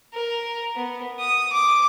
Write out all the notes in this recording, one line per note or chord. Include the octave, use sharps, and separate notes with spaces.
A#4
B3
D#6
D6